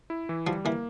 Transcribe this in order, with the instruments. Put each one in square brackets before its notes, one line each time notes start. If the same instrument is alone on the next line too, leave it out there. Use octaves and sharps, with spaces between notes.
[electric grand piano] E4
E3
[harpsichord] F3 [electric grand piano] G3
[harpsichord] E3 [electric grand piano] A#3